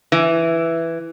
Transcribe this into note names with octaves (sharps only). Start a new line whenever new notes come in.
E3